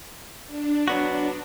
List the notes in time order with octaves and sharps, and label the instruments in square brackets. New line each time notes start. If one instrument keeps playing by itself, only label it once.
[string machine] D4
[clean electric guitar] F#3 B3 F#4